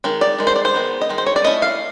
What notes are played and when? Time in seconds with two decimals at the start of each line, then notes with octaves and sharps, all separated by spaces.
0.04 D#3 G#3
0.21 D5
0.39 D#3 G#3
0.47 C5
0.56 D5
0.65 C5
0.74 D#3 G#3 B3
1.01 D#5
1.10 D#3 G#3
1.18 C5
1.27 C#5
1.36 D5
1.44 A3 C#4 E4 D#5
1.62 F5